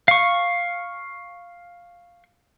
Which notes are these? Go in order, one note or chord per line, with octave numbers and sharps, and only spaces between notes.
F5 C#6